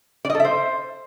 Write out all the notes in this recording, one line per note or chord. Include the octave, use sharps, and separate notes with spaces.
D5
D#5
A4
E5
C5